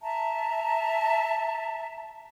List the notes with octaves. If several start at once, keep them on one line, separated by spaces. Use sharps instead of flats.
E5 A5 A#5